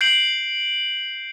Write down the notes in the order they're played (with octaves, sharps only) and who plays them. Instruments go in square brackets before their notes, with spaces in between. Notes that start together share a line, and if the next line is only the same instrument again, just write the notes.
[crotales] G6 C7 D7 F#7